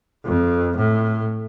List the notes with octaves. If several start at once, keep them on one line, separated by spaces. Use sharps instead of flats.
F2
A2